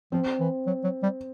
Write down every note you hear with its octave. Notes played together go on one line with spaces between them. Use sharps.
F3 C4
E3
F#3
F#3
G3